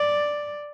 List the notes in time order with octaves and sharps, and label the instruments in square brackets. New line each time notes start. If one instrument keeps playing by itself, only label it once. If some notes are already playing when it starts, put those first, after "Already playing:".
Already playing: [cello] D5